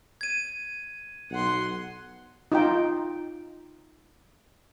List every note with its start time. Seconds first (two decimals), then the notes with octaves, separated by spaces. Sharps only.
0.21 G#6 D#7
1.31 B1 F#5 C6
2.52 D#4 F4 G5